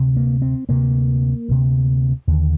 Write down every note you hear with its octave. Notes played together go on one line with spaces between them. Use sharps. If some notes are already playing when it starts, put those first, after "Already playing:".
Already playing: D2 C3
A#3
C4
D2 C3 A#3
D2 C3
D#2 D3